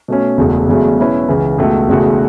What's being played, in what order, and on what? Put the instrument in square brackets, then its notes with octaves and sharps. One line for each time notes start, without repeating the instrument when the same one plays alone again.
[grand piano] B2 A3 C#4
E1 E2 C#3 A3 F#4
E1 E2 C#3 F#3 A3
B2 F#3 C#4 E4 B4
C#2 C#3 E3
C#2 B2 A3
E1 E2 C#3 A3 F#4